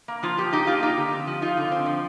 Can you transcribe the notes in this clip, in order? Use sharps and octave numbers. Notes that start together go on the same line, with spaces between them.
A#3
F3 F4
F3 G4
D#4 G4
A#3 F4
D#4 G4
D3
C4
F3
D#4 F4
D3
C4
F3